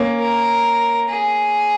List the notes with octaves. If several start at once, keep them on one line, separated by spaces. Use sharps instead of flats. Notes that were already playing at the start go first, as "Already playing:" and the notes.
Already playing: A#3 C#4
A#4
G#4